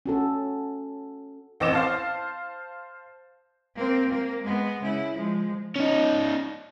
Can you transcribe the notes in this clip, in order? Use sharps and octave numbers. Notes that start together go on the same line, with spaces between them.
C#4 F#4 A4
A1 C4 D#5 D6 E7
C5 F5 A5
A#3 C4
A#3
G#3 B3
C#3 E4
F3 G#3
C#4 D#4